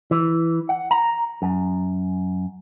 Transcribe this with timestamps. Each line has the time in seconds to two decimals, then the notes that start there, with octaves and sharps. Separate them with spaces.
0.11 E3
0.69 F#5
0.91 A#5
1.42 F#2